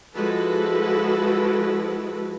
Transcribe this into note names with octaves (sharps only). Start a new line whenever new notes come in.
F3 G#3 E4 F#4 A4 B4